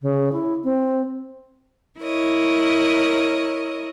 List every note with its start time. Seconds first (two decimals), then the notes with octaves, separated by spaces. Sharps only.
0.02 C#3
0.32 E4
0.64 C4
1.99 E4 A#4 C#5 D#5